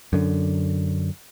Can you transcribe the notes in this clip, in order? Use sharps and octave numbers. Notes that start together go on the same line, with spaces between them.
F#2 D3